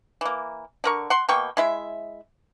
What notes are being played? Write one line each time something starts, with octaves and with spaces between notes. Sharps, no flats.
E3 A#3
D3 A#4 C#6
F#5 C6
B2 A#3 G5 C#6
G#3 E4 E5